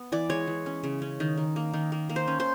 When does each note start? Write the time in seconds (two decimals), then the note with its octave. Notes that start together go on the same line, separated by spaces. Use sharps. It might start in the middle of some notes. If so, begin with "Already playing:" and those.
Already playing: B3
0.12 E3 D5
0.30 G#3 C#5
0.47 E3
0.66 C#4
0.83 C#3
1.02 C#4
1.20 D#3
1.37 D#3
1.56 A#3
1.73 D#3
1.92 A#3
2.09 A#3
2.16 C5
2.27 C#4
2.40 C5